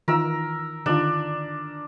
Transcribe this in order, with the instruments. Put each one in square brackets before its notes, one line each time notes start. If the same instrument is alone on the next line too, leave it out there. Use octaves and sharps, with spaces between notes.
[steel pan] D#3 E3 F4 [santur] A#4 E6
[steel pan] D3 D#3 F4 [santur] D4